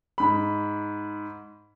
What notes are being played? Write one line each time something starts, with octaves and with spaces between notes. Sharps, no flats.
G#2 B5